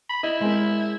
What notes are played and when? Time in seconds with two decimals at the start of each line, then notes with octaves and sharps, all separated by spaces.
0.09 B5
0.23 E4 D#5
0.41 G#3 C4 A#4